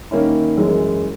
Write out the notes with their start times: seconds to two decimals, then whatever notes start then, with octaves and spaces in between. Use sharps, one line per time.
0.11 D#3 A#3 C#4 E4
0.57 F#2 E3 G#3